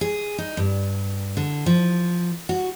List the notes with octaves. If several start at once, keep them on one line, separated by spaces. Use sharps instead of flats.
G#4
D#4
G2
D3
F3
F#4